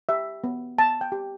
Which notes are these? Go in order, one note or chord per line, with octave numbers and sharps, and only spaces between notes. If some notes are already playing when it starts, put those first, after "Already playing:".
G4 E5
B3
B3 A5
G5
G4